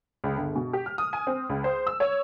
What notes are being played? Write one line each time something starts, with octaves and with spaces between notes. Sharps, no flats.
C#2
G1
B2
G4
F6
D#6
G#5
C4
C#2
C5
E6
C#5